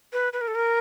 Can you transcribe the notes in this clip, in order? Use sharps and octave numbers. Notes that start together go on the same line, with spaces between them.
B4
B4
A#4
A4
A#4